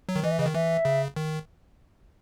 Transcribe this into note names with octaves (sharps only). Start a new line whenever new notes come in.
F#3
D#3
E3 D#5
E5
C#3 D#5
D#3
E3 E5
C#3
D#3